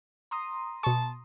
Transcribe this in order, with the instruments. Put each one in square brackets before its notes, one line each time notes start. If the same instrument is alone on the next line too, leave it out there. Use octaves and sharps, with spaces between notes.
[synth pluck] A#5 C6 D#6
[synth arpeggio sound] B2 C#6 [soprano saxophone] A5